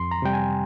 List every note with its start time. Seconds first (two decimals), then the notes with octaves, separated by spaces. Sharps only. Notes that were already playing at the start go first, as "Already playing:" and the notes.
Already playing: F2 C6
0.11 A#5
0.22 C3 G3 G5
0.33 G#5